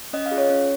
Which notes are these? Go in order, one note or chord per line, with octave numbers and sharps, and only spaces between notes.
C#4 D#5
F5
F4 G#4
C#5
C#4